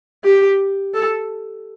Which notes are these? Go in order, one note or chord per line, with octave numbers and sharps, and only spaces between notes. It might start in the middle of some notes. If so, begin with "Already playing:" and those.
G4
A4